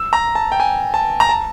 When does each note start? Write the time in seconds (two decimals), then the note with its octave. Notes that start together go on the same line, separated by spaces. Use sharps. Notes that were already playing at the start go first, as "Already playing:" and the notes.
Already playing: E6
0.13 A#5
0.35 A5
0.52 G5
0.60 G#5
0.94 A5
1.20 A#5
1.29 A5